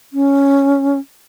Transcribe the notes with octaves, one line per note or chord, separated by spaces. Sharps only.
C#4